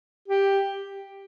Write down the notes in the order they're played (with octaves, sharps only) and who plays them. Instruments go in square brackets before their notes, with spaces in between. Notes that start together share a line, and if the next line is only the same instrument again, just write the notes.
[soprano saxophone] G4